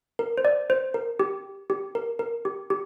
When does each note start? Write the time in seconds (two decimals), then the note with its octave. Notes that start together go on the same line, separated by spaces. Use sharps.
0.19 A#4
0.38 C5
0.45 D5
0.70 C5
0.94 A#4
1.20 G4
1.70 G4
1.95 A#4
2.19 A#4
2.45 G4
2.70 G4